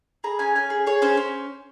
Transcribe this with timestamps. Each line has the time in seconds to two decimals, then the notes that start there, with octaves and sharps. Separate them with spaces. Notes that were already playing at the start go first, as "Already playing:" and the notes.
0.24 G#4 A#5
0.39 C#4 G#5
0.55 C#4 G#5
0.70 G#4
0.86 G#4 C#5
1.02 C#4 C5
1.17 C#4